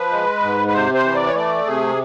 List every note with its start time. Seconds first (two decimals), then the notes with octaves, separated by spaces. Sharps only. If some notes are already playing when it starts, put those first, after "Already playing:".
Already playing: F3 B4
0.11 G#3
0.42 G#2
0.68 B4
0.73 C3 C5
0.94 C5
1.04 E3
1.15 D5
1.28 C#5
1.35 A3 D5
1.66 C3 G#4